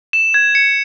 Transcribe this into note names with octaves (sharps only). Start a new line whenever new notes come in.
E7
G#6
C#7